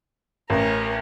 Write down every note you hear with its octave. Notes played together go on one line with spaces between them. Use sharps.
A1 C#4 A#4